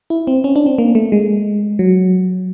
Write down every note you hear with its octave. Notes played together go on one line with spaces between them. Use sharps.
E4
C4
C#4
D4
C4
A#3
A3
G#3
F#3